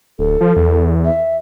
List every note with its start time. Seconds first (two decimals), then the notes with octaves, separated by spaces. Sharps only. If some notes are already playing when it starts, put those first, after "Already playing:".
0.19 D1 A4
0.41 F3
0.56 E2
1.05 E5